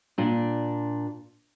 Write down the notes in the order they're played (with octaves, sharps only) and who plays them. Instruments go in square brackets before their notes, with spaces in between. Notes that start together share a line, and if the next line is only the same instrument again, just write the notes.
[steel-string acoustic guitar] A#2 D4